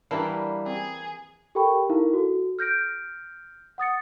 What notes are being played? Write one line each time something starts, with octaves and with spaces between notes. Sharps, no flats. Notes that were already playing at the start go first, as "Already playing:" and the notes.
E3 G3 A#3 D4 E4 A#4 F5 A5
C4 G#4
G4 A4 A#4 G5 B5 C#6
D#4 E4 A#4 F5
F#4 A4
F6 G6 A#6 D7
F#5 D#6 A6 C#7